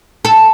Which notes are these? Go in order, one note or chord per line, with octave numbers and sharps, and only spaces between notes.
A4